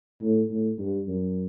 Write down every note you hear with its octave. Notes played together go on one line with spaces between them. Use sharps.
A2
A2
G2
F#2